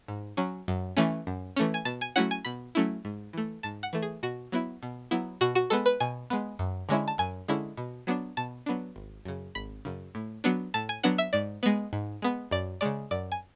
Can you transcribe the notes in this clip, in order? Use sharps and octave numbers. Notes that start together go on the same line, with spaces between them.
G#2
F#3 C#4
F#2
E3 A3 C#4
F#2
E3 A3 C#4
G#5
B2 A5
G#5
F#3 A3 C#4 E4 F#5
G#5
B2 B5
F#3 A3 C#4 E4
G#2
E3 A3
G#2 A5
F#5
E3 A3
G#4
B2 F#4
F#3 B3 E4
B2
F#3 B3 E4
B2 F#4
F#4
G#3 B3 A4
B4
B2 G#5
G#3 B3
F#2
D3 G#3 C#4 E4
A5
F#2 G#5
D3 G#3 C#4 E4
B2
F#3 B3 D4
B2 A5
F#3 B3 D4
G#1
F#2 C#3
G#1 B5
F#2 C#3
A2
F#3 B3 D4
A2 A5
G#5
F#3 B3 D4 F#5
E5
G#2 D5
G#3 B3
G#2
G#3 B3
F#2 D5
C#3 G#3 D5
F#2 D5
G#5